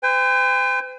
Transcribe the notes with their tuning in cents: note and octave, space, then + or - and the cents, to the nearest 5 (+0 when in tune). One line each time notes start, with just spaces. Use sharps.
C5 -45 G5 +45